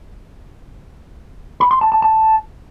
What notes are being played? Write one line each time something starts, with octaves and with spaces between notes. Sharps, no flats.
B5
C6
A5
A5
A5